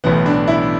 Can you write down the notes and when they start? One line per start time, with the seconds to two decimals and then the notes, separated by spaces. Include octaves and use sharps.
0.04 B1 A2 E3 B3
0.26 D4
0.47 E4